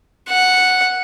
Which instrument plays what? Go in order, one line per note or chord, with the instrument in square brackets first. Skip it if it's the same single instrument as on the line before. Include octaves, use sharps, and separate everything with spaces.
[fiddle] F#5